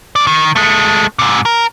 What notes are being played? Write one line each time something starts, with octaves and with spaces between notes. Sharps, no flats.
F#2 D5
D#3
G#3 A3
G#2 C3
A#4